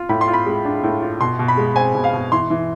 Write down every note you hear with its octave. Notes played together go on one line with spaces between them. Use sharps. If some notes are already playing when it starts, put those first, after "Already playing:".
Already playing: F4
A2 B5
C6
F4
B5
G#3
D4
A2
F4
B2 C6
B2
B5
G#3
C4 G#5
B2
F5
B2
E3 C6
E3